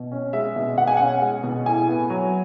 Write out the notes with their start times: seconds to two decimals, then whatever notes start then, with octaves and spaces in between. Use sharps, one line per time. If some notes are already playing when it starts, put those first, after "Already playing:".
Already playing: B2
0.12 C#4
0.33 G#3 E5
0.56 B2
0.78 B2 F#5
0.87 G#5
0.97 C#4 F#5
1.22 G#3
1.43 B2
1.66 A2 G#5
1.88 B3
2.10 F#3